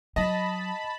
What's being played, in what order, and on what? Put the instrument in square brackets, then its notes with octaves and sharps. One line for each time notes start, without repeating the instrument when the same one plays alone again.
[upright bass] F#3 [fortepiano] D#5 [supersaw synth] A5 B5